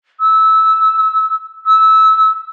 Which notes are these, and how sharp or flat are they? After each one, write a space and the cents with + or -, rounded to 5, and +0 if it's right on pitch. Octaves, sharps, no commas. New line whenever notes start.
E6 -15
E6 -20